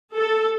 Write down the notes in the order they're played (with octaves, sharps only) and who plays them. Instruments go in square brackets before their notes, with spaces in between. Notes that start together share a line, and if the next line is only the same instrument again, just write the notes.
[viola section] A4